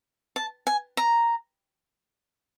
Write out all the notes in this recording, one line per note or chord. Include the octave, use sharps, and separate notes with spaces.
A5
G#5
A#5